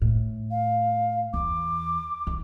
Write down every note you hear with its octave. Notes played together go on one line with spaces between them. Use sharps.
A2
F5
E2 D6
D#3